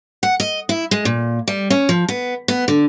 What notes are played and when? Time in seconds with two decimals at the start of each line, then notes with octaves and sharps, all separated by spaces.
0.23 F#5
0.40 D#5
0.69 E4
0.91 G#3
1.05 A#2
1.48 G3
1.70 C#4
1.89 F3
2.08 B3
2.48 B3
2.68 D3